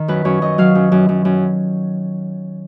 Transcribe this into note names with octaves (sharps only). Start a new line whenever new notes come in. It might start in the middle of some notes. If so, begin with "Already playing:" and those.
Already playing: D#3
F#2 B4
F#2 C#5
F#2 D#5
F#3 F5
F#2
F#2
F#2
F#2